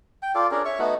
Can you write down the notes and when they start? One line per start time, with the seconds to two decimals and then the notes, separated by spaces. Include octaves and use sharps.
0.23 G5
0.35 F4 A4 D5
0.51 C#4 D4 G#4 A#4
0.65 C#5 E5 C#6
0.79 A3 B3 D#4 F#4